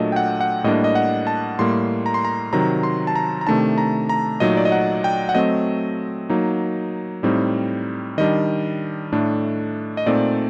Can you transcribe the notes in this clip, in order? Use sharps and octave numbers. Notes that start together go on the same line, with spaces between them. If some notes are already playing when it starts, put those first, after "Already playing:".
Already playing: A#2 F#3 A3 D4 D#5
G5
F#5
F#5
A2 G3 A#3 D4 D#5
D#5
F#5
A5
A2 G3 A#3 C6
A#5
C6
A#5
C3 D#3 F#3 A#5
C6
A5
A#5
A#5
C3 D#3 A3 D4 A5
A#5
A#5
A#2 F#3 A3 D#4 D#5
D5
D#5
F#5
G5
F#5
F#3 A3 C4 D#5
F#3 A#3 D#4
A2 G3 C4 D#4
D#3 G3 D4 D#5
A2 A3 D4
D#5
A#2 A3 C4 D#4 D5